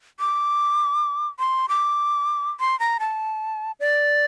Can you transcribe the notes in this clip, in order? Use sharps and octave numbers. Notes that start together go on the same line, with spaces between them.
D6
C6
D6
C6
A#5
A5
D5